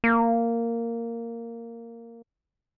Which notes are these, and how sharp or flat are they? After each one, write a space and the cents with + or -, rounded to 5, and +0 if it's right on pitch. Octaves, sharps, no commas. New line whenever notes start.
A#3 -10